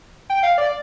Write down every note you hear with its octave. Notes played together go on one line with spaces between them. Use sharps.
G5
F5
D5